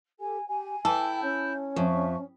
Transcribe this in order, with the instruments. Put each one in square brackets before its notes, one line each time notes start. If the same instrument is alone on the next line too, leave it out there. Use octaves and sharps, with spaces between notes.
[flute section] G4 A4 [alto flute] G#5
[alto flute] G4 [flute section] G#5
[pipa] E3 A4 [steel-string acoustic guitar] E4 [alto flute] G5
[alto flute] C#4 [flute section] G6
[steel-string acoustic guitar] F2 [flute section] E5 A5 C#6